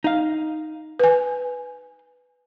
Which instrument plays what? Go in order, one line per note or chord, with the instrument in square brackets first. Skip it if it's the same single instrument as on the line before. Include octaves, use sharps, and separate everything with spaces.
[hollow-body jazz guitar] D#4 F5
[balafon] B4 G#5